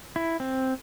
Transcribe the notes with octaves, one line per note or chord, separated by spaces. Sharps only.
E4
C4